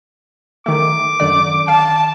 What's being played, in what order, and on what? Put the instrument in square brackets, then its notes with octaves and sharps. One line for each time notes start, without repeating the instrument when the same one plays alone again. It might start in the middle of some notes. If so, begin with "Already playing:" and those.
[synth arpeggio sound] D#3 A3 [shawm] D6
[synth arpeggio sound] F#2 D3 D5 [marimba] D#3
[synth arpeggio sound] F5 [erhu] A5